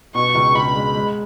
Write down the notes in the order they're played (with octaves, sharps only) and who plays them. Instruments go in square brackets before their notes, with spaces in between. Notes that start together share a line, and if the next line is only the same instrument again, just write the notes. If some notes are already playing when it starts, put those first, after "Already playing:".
[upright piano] B2 [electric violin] C#6
[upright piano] C#2
[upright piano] C#2 [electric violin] B5
[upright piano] G#3
G#3